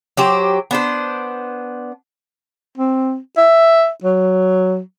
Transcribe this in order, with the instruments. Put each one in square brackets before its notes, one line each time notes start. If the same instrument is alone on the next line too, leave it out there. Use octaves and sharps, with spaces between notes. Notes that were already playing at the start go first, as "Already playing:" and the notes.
[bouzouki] F#3 G4 C5
B3 D4 C5
[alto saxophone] C4
E5
F#3